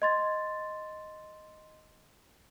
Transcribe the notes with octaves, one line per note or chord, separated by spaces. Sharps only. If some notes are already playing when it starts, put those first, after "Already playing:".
D#5 C6 A6